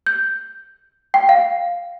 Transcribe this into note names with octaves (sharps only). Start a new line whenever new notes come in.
G6
G5
F5